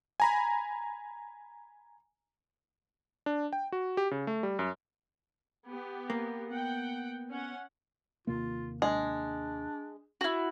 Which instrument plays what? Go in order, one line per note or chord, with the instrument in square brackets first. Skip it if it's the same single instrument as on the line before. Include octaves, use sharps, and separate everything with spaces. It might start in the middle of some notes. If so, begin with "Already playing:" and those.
[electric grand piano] G#5 A#5 B5
D4
G5
F#4
G4
C#3
A3
G3
F#2
[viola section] B3 G4
[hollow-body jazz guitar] A#3
[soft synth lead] B3 [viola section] F#5 G5
[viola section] C#4 F#5
[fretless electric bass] D#2 C3 A#3 [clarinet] F4
[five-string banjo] G#3 [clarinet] D4
[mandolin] E4 F#4